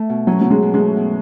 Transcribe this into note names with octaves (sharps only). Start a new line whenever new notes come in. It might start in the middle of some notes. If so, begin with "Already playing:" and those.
Already playing: A3
B2
F#3 C#4
B2 F#3
G#3
B2
G#3
A3
B2